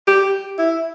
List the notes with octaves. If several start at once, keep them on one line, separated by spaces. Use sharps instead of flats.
G4
E4